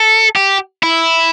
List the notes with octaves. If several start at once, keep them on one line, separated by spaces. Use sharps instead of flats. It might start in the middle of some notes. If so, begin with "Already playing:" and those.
Already playing: A4
G4
E4